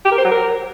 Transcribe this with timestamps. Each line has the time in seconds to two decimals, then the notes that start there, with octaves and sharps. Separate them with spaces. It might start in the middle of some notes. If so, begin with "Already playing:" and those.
0.05 G4
0.12 A#4
0.18 C5
0.25 F#3
0.31 A#4